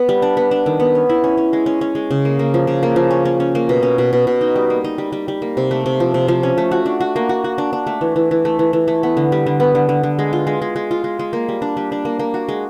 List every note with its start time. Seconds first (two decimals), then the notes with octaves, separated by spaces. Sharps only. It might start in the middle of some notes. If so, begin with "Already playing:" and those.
Already playing: B3
0.09 G3
0.22 D4
0.37 B3
0.51 D4
0.66 D#3
0.80 B3
0.95 C#4
1.09 E4
1.24 C#4
1.37 C#4
1.53 G#3
1.66 C#4
1.81 C#4
1.95 G#3
2.11 C#3
2.25 A#3
2.39 A#3
2.54 F3
2.67 C#3
2.83 A#3
2.96 F3
3.10 C#4
3.25 C#4
3.40 C#4
3.55 A#3
3.69 B2
3.83 C#4
3.98 B2
4.13 B2
4.27 B2
4.41 D#4
4.56 G3
4.70 A#3
4.84 D#4
4.98 G3
5.12 G3
5.28 G3
5.42 A#3
5.57 C3
5.71 A3
5.86 C3
6.00 F3
6.14 C3
6.28 F3
6.43 C#4
6.58 A3
6.71 F#4
6.86 D4
7.00 F#4
7.16 A#3
7.29 F#4
7.44 F#4
7.58 D4
7.73 D4
7.87 A3
8.01 E3
8.16 E3
8.31 E3
8.45 A3
8.59 E3
8.73 E3
8.88 A3
9.03 B3
9.17 D3
9.32 G3
9.46 D3
9.60 B3
9.75 D3
9.89 D3
10.03 D3
10.19 G#3
10.33 F4
10.47 G#3
10.62 G#3
10.76 G#3
10.91 F4
11.04 G#3
11.19 G#3
11.33 A#3
11.49 G3
11.62 D4
11.77 G3
11.92 D4
12.05 A#3
12.19 A#3
12.34 F#4
12.49 G#3